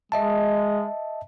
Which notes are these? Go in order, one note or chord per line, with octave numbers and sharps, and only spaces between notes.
G#3 D#5 E5 A5